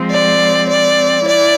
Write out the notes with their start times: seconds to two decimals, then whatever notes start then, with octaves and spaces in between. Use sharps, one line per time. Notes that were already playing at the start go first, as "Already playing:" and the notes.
Already playing: F3 G#3 C4
0.11 D5
0.69 D5
1.27 E4 D5